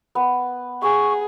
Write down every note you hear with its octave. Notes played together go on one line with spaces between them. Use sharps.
B3
G#4 C#6